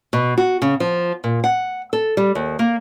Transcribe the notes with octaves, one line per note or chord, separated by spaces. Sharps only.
B2
F#4
C#3
F3
A#2
F#5
A4
G3
D#2
A#3